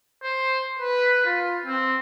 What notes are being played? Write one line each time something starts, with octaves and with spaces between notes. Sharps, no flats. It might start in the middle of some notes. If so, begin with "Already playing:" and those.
C5
B4
F4
C4